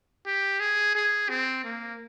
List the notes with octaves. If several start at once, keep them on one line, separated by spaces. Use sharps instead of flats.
G4
G#4
G#4
C4
A#3